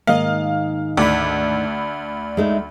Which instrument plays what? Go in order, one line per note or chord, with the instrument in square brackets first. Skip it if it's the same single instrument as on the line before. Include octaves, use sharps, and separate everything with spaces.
[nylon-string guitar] G#2 D#3 D#5 [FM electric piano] A#3 [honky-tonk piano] F5
[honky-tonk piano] D2 [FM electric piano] D5 B5
[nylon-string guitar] G#3 A3 D#4